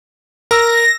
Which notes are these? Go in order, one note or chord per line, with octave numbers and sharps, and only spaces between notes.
A#4 E6 A#6